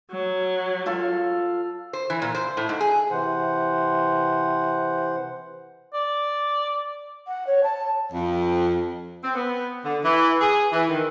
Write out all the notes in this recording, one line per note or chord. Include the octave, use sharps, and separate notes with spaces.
F#3
F4 A4 F5
C5
E3
A#2
C5
A2
G#2
G#4
C3 E3 C5 F#5
D5
F#5
C#5
A5
F2
C4
B3
D3
E3
G#4
E3
D#3